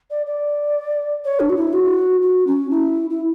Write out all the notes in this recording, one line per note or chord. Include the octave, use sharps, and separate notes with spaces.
D5
D5
C#5
D4
F#4
E4
F#4
F#4
C#4
E4
E4